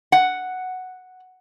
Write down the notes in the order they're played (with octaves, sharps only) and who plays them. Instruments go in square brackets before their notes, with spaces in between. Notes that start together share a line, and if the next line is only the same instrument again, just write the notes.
[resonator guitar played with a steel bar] F#5